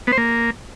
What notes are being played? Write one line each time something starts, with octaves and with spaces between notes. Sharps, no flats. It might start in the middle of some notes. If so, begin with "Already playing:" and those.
B3
C5
A#3